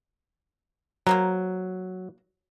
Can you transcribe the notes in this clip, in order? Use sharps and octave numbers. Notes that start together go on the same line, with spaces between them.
F#3 A#3 C5 A#5